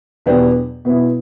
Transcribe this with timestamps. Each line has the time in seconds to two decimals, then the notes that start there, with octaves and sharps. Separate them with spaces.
0.26 E2 B2 B3 D4 G4
0.85 B2 B3 E4